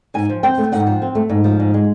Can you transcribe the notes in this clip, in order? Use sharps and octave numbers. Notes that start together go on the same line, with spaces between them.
G#2 G#5
F3
C4 G5
A3
G#2 F#5
F3
C4
A3
G#2
F3
G#2
G#3